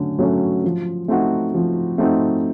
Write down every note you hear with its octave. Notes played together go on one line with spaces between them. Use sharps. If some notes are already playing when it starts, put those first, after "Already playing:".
Already playing: D3 F#3 A3 C#4
F#3 A3 C#4 F#4
F3
A3 C4 D#4 F#4
F3
A3 C4 D#4 F#4